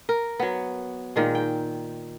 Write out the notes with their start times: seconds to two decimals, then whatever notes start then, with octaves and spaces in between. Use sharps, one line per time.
0.09 A#4
0.40 F#3 B3
1.16 A#2 D#3 G#3
1.35 G5